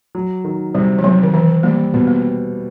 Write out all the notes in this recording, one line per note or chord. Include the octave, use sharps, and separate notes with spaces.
F#3
D#3
C3 G3
F3
C3 F#3
D#3
E3 C4
G3 A#3
B2 B3
A#3